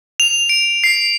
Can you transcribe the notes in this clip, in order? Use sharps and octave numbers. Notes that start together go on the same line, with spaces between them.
F7
D7
C7